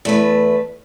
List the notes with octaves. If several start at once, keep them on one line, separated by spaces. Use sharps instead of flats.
E2 A3 B4